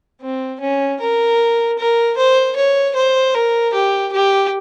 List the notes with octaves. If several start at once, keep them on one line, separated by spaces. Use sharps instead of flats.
C4
C#4
A#4
A#4
C5
C#5
C5
A#4
G4
G4